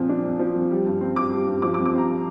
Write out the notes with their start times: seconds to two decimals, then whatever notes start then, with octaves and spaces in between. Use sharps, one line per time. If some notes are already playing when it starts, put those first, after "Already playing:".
Already playing: F2 A#2 F3
0.09 D4
0.25 F2
0.39 F3
0.55 F2
0.71 G3
0.86 G2
1.01 C4
1.16 G2 D6
1.32 G3
1.47 G2
1.62 F3 D6
1.74 D6
1.78 F2
1.85 D6
1.93 C4 A#5